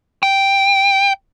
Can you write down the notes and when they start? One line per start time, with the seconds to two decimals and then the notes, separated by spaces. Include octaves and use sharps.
0.23 G5